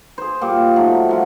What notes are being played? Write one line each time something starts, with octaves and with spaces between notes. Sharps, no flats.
G#4 C5
A#2 G3 G4 G5
G#2 F#3 A3
F3 F#3 F4